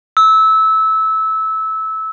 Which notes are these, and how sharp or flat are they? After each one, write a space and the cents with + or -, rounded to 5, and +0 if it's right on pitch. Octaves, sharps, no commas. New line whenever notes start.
E6 -20